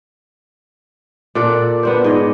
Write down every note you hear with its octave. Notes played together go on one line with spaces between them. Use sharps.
A#2 A4 D5 F#5
B3 D4 C5
G#2 D#5